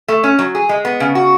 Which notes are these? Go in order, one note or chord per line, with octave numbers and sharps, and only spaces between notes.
A3
C#4
F#3
G#4
G#3
B3
C#3
F#4